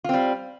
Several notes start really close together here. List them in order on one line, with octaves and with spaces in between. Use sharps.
F4 C4 G3